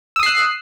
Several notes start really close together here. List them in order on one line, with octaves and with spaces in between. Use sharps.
E6 D#6 C7 F#6